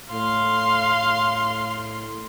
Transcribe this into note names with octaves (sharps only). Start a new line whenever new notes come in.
A2 F5 C6